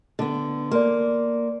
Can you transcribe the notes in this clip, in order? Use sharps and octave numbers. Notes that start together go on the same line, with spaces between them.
D3 B3
A#3 D5 C6